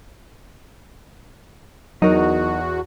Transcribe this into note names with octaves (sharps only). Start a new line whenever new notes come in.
E2 F#3 D#4 F#4 A#4